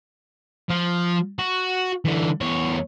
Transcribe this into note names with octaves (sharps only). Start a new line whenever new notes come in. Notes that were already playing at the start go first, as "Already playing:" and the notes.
F3
F#4
D3 E3
E2 C#5